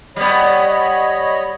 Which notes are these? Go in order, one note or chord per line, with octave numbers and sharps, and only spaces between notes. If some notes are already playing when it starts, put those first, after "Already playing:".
G3 B3 C#5 D#5 B5